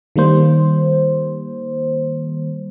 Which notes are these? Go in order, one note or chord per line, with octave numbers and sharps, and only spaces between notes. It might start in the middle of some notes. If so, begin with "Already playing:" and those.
D#3 G3 A#3 C5